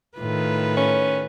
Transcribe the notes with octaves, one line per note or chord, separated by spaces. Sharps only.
A2 D#3 F4 B4
C#4